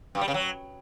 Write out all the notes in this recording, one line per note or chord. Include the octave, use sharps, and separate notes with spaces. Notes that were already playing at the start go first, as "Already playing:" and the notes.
G2
G3
C#3
F#3